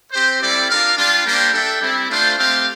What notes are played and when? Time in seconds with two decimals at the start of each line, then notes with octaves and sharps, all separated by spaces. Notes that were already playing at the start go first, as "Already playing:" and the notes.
0.12 C4 G4 C5
0.41 G3 C4 E4 A4 D5
0.70 D4 F4 A#4 F5
0.97 G3 D4 F4
1.25 G3 A#3 D4 G4 C5
1.54 D4 A4 E5 G5
1.82 G3 C4 E4
2.10 A3 D4 F4 C5 F5
2.38 A3 C4 G4 C5 F5